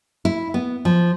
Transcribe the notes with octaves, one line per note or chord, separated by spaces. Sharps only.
E4
B3
F3